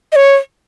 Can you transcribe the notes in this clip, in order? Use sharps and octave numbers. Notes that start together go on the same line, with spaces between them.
D#5
C#5